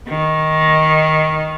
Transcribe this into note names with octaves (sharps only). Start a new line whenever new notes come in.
D#3